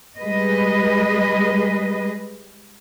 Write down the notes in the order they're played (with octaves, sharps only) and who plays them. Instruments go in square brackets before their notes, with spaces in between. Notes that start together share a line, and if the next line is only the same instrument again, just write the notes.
[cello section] G3 G#3 G#4 B4 D#5